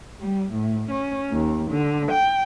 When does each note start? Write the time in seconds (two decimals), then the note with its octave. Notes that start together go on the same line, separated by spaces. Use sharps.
0.19 G3
0.50 A2
0.88 C#4
1.32 D#2
1.70 D3
2.10 G5